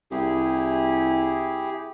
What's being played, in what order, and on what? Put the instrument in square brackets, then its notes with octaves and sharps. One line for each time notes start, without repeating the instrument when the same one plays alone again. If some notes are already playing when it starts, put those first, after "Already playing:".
[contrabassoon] C2 [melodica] E4 G4 G#4